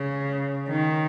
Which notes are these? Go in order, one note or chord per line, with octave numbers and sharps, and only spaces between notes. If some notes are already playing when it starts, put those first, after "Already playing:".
Already playing: C#3
D#3